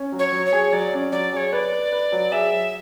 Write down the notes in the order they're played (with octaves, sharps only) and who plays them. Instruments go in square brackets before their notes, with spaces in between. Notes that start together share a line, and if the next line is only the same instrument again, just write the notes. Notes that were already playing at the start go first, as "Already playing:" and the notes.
Already playing: [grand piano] C#4
F#3
[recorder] C#5
[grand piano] F#3
[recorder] C#5
[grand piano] G#4
[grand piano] F#3 [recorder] D5
[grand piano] C#4
[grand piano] F#3 [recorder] D5
[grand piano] G#4 [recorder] C#5 D5
[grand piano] B4 [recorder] D5
[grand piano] B4
B4
F#3
[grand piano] G#4 [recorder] E5
[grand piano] F#3